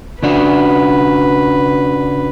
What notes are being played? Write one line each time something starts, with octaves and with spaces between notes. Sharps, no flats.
C#3 D4 F#4 B4